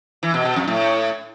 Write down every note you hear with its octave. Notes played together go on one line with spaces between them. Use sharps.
E3
B2
B2
F2
A2